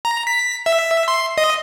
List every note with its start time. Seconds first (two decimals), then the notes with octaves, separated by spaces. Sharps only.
0.05 A#5
0.27 B6
0.66 E5
1.08 C6
1.38 D#5